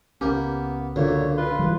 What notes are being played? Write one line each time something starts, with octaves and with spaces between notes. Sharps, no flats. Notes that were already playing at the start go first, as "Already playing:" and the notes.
C#2 A#3 B3 C#4 G4
B1 A#2 D3 A#3 C#5
F4 B4 C6
E3 G3